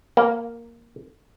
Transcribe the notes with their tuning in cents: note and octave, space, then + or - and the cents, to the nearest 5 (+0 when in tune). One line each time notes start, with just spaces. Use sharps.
A#3 +0